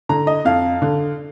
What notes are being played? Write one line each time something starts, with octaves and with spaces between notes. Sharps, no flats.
D3 A#5
D#5
F2 F5
D3